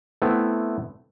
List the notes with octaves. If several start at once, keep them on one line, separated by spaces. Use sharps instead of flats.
A3 B3 C4 E4